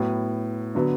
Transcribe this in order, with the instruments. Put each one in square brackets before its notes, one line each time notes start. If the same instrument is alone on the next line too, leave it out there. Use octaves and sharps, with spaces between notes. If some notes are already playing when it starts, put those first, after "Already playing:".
Already playing: [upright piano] A2 F#3 B3
D3 F#3 B3